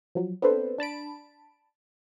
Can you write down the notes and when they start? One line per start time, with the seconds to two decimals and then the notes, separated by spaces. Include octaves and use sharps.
0.15 F3 F#3
0.42 B3 C4 D4 A4 B4 C5
0.78 D4 A5 B5 D7